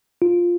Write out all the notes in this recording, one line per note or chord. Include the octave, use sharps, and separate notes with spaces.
F4